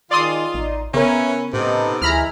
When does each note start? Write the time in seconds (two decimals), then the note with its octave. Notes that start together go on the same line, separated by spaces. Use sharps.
0.11 D#3 G#3 F4 D5 C6 D#6
0.54 A1 D#4
0.94 C#3 B3 C#4 A#4 B4 C#5 E5
1.53 A2 C3 B3 D#4 A4
2.02 D2 E3 G#3 E4 A#5 B5 F6